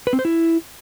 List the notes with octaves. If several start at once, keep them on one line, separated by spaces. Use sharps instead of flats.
B4
C4
C5
E4